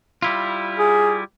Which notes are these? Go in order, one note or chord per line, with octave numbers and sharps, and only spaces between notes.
G3 E4 F4
G#4